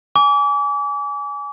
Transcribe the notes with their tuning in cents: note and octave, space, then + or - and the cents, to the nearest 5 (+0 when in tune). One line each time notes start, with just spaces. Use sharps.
G#5 +0 D6 -35